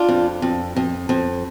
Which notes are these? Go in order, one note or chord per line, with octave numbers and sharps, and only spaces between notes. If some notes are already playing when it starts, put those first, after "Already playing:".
Already playing: D4 F4
F2
F2
F2
F2